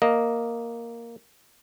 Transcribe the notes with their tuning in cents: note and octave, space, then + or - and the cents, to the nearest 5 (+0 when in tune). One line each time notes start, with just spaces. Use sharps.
A#3 +0 D#5 +0